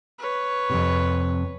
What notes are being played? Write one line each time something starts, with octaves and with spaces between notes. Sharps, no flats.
B4 C#5
F2 C3